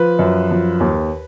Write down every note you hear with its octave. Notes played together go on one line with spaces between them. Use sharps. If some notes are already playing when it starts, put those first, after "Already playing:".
Already playing: F3 B4
F#2
F3
D#2